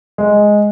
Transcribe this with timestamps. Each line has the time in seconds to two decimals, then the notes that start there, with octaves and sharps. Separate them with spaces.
0.18 G#3